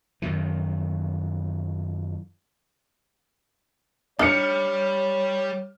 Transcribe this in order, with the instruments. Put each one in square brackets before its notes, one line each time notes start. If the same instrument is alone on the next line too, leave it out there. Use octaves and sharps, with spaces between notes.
[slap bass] F#2 D#3 E3
[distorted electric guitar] G3 [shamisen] D4 D#4 [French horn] C#5 [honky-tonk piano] F6 C#7